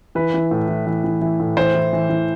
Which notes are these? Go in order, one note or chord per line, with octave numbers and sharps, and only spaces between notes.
E3 B4
E3
A2
E3
E3
E3
E3
A2
E3 C5
E3
E3
E3